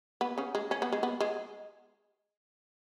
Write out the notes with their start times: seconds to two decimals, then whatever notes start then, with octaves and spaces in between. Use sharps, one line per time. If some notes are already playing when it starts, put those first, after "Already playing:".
0.21 B3
0.38 C#3 C#4
0.55 G#3
0.71 C#4
0.82 B3
0.93 G#3
1.03 B3
1.20 G#3